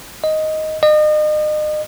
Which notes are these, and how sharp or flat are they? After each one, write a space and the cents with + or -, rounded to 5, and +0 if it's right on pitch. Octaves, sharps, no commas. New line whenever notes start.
D#5 +5
D#5 -35